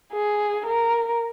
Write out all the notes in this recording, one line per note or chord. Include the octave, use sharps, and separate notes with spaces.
G#4
A#4